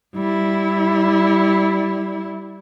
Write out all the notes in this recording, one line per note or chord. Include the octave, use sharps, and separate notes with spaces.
G3 E4